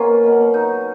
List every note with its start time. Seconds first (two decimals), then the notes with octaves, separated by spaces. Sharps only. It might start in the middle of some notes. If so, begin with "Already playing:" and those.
Already playing: B2 A#3 C#4 F4
0.24 B2 F#3
0.54 D#4